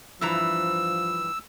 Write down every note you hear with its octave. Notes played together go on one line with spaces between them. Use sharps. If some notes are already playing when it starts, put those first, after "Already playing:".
G2 E3 F3 A#5 E6